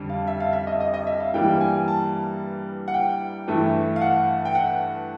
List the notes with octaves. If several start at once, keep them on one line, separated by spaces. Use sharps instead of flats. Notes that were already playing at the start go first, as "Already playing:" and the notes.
Already playing: F2 D3 G3
F5
E5
F5
E5
D#5
D#5
D#5
E5
F5
G2 E3 G3 A#3 G5
G#5
A5
F#5
G5
G2 E3 A3
F5
F#5
G5
F#5